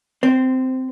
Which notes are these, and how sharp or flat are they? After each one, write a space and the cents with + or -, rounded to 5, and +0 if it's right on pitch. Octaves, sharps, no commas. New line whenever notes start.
C4 -15 C5 +0